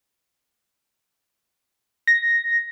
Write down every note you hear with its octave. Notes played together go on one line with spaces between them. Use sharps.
A#6